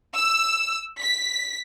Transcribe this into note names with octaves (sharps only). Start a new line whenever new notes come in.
E6
B6